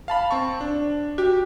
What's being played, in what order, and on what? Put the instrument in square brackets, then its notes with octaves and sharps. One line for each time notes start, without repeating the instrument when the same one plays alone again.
[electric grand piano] F5 A5 B5
C4 A5 C#6
D4
[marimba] F#4 [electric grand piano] G4